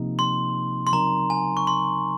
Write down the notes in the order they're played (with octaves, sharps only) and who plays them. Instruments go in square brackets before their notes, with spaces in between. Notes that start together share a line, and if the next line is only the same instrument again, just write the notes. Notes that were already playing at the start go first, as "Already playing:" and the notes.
Already playing: [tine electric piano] C3 F3 A#3 D#4
[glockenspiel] C6
C6
[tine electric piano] C#3 F#3 C4 D#4 A#4 [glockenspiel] A#5
[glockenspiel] G#5
C#6
C6